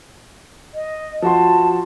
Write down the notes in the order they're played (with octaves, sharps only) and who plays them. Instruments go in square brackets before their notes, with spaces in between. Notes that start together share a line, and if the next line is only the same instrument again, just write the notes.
[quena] D#5
[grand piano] F3 F#4 C6 [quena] A5